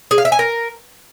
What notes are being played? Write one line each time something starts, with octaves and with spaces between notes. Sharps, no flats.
G#4
F5
E5
G#5
A#4